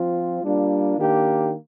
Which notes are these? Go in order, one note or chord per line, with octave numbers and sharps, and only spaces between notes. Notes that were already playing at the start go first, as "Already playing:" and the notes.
Already playing: F3 C4 F4
G3 A#3 D4 F4
D#3 A#3 D4 G4